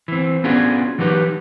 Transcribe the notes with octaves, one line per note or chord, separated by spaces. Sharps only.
E3 C4
B3 C#4 D4 F4 F#4 G#4
E3 F#3 D#4 G4 B4